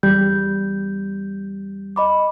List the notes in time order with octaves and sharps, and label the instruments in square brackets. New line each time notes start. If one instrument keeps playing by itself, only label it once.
[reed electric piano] E2 G3 [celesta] G6
[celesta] D#5 B5 D6